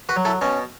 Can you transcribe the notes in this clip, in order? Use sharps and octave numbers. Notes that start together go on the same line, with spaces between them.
F#4 B4
F#3
E4 A4
B2 C#4